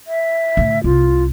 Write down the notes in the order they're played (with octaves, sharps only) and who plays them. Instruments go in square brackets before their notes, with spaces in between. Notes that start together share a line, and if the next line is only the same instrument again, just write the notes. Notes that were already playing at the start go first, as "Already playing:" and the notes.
[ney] E5
[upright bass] A2 D3
[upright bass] C2 [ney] F4